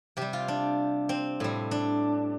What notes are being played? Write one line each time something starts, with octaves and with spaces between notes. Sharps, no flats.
C3 G3 G4
F4
D4
C4
A2 G3
D4